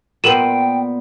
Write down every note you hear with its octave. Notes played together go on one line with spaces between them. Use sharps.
A#2 B3 A#4 C5 G5 D#7 E7